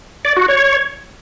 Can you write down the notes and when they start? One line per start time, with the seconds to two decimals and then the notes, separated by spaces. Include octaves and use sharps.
0.25 D5
0.36 F#4
0.48 C#5